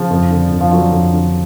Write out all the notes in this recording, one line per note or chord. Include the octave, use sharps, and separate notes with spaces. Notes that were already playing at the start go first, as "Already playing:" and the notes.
Already playing: C#3 F3
F2
D3
F2
F3
D3 F#3
F2
D3